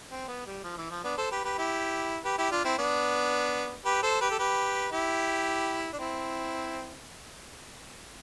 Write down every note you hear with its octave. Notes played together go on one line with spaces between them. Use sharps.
C4
B3
G3
F3
E3
F3
B3 D4
A4 C5
G4 B4
G4 B4
E4 G4
G4 B4
E4 G4
D4 F4
C4 E4
B3 D4
G4 B4
A4 C5
G4 B4
A4
G4 B4
E4 G4
D4
C4 E4